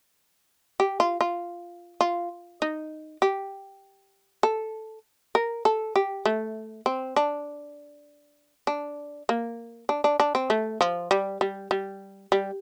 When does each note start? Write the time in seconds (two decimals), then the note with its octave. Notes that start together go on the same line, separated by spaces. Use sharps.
0.80 G4
1.00 F4
1.21 F4
2.01 F4
2.62 D#4
3.22 G4
4.43 A4
5.35 A#4
5.65 A4
5.96 G4
6.25 A3
6.86 C4
7.16 D4
8.67 D4
9.29 A#3
9.89 D4
10.04 D4
10.20 D4
10.35 C4
10.50 A3
10.81 F3
11.11 G3
11.41 G3
11.71 G3
12.32 G3